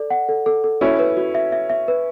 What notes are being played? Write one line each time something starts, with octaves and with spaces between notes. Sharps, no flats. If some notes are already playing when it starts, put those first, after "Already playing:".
Already playing: A4 D5
F#5
A4
A4
A4
C#4 E4 F#4
B4
F#4
E5
E5
E5
B4